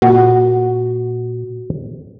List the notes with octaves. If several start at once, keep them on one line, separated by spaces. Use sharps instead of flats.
A#2 F#4